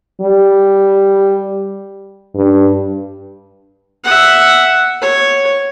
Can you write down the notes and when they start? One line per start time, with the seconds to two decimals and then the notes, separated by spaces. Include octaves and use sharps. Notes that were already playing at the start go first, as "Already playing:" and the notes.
0.21 G3
2.35 G2
4.04 E5 F#5
5.02 C#5